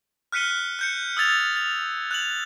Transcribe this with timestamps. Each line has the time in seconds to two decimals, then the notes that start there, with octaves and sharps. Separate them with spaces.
0.32 F6 F#6 B6 C#7 D#7 G7
0.79 F#6 G6 C#7
1.17 D#6 E6 F#6 G#6 A6 F7
1.56 A6 F7
2.11 F#6 F7 F#7